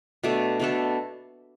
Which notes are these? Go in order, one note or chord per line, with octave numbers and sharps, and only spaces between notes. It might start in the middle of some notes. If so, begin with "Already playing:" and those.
B2 A3 D4 A4
B2 A3 D4 A4